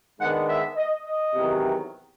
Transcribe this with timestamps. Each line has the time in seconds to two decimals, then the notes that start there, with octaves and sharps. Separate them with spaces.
0.19 G#2 D#3 G#3 B3 D4 F#5
0.48 E5
0.76 D#5
1.05 D#5
1.34 E2 C3 D#3 F#3